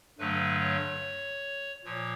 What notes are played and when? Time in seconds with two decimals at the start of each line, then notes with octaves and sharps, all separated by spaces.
0.18 G2 D3 F#3 A3 B4
0.59 C#5
1.84 A#2 F3 C#5